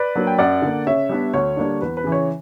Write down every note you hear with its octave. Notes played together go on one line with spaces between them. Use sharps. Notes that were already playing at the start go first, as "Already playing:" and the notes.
Already playing: B4 D5
F#3 A#3 D4
G5
F#2 D5 F#5
D3 A#3
C#3 C#5 E5
G3 B3 D4
D2 C#5
D3 G3 A#3 D4
E2 B4
B4
C#3 E3
C#5